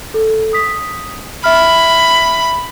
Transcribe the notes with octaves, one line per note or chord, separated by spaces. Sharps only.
A4
D#6 B6
E5 B5 F6